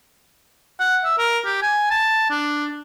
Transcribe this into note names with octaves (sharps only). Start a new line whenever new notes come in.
F#5
E5
A#4
G4
G#5
A5
D4